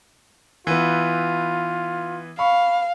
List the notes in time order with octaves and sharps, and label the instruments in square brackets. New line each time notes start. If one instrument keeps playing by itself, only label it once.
[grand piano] E3 B3 [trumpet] F4
[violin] F5 [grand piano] B5 C#6